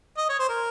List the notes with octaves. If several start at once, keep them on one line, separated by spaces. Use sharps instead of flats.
D#5
C#5
C5
A#4